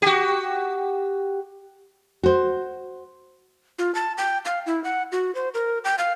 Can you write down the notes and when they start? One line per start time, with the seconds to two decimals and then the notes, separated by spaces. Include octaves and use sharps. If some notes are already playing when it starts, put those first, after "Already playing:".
0.02 F#4 G4
2.23 F#4 C5
3.79 F4
3.95 A5
4.18 G5
4.45 F5
4.66 E4
4.84 F#5
5.12 F#4
5.35 C5
5.54 A#4
5.84 G5
5.98 F5